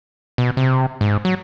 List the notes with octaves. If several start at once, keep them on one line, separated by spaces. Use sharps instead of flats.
B2
C3
G#2
F#3